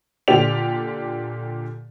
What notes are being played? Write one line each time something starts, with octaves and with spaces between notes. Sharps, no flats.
A#2 D3 G4 D5 F7